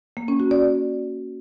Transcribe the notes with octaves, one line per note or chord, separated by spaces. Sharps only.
A#3
C#4
F#4
D5